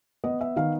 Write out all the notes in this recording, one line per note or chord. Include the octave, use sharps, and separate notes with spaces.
B3 D#5
E5
D#3 F5